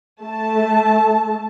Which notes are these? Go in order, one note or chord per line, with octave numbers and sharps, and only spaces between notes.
A3 A5